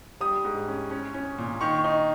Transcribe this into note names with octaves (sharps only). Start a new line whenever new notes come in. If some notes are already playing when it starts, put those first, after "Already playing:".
G3 D#6
G#2
C#4
C#4
C#4
A#2
D#3 C#6
D#4